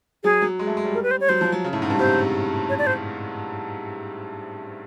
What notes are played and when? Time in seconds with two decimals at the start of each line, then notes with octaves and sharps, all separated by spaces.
0.24 F#3 G#4
0.42 F#3
0.59 G#3
0.67 A3
0.77 G#3
0.85 G3
0.95 A#4
1.03 B4
1.11 C5
1.21 C#5
1.29 F#3 C5
1.41 F3
1.52 F#3
1.64 C#3
1.73 A2
1.82 G#2
1.90 G2
1.99 C3 C5
2.69 C#5
2.78 D5
2.87 C5